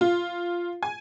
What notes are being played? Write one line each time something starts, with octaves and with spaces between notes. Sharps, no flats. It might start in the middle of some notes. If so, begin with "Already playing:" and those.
F4
G#5